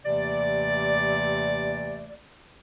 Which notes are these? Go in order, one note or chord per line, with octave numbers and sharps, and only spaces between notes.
D#2 C3 E3 A3 D5